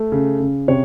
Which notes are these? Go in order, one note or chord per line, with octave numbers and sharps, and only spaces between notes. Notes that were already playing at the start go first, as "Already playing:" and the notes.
Already playing: A3
C#3
C#3
C3 C#5